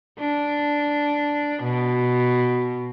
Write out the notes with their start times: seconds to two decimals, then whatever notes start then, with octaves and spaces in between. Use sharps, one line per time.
0.19 D4
1.63 B2